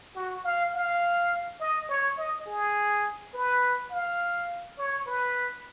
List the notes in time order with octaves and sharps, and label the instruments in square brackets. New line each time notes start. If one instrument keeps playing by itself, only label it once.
[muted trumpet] F#4
F5
F5
D#5
C#5
D#5
G#4
B4
F5
C#5
B4